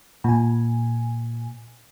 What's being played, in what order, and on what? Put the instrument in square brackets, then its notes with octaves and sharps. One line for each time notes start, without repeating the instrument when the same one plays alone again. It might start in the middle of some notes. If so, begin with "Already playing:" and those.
[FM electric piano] A#2 G#5